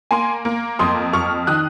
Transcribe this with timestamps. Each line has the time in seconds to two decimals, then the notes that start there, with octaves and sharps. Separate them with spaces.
0.11 A#3 G#5 C6
0.45 A#3
0.79 F2 C6 D#6
1.13 F2 C#6 F6
1.47 D#3 D#6 F#6